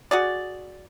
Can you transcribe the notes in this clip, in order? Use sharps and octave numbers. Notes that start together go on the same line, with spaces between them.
F#4 G#4 D5